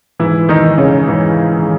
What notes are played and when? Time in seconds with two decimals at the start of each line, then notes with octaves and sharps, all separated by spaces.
0.20 G#2 E3 E4
0.49 D#3 D#4
0.64 D#3
0.78 C#3 C#4
1.07 G#2 E3 E4
1.51 D#3